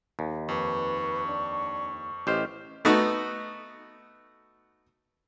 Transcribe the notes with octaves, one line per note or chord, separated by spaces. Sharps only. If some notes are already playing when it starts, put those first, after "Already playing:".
D#2
F2 B4 C#6
D4
A1 G4 C5 D#5 F6
A3 B3 D#4 F#4